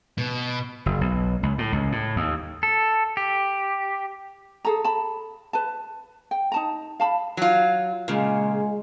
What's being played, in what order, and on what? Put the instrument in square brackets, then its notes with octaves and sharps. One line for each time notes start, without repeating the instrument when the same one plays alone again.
[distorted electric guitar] B2
[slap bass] F#1
B1
C#2
A2
C#2
A2
D#2
[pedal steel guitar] A4
G4
[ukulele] G#4 A4 A#5
A5 B5
B4 A5
G5
D#4 A5 A#5
F5 A5 B5
[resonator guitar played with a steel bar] F#3 F4
[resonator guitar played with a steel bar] A#2 C#3 [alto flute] G#3